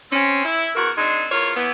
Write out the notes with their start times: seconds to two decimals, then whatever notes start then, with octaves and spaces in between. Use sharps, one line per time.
0.11 C4 C#4
0.44 E4
0.75 E2 F#4 A#4
0.97 G#3 C4 D4 D#4
1.31 E2 F4 A#4 C#5
1.55 E3 B3